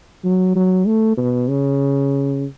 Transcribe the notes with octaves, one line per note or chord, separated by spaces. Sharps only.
F#3
F#3
A3
B2
C#3